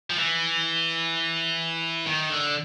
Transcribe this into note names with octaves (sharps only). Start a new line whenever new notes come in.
F3
E3
D#3
D3